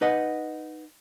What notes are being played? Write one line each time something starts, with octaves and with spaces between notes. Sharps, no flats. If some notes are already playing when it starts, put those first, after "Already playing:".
D#4 B4 D#5 F#5